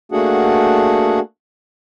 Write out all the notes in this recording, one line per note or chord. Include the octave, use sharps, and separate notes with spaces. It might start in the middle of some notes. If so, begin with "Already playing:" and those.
A3 A#3 D4 F#4 G#4 F#5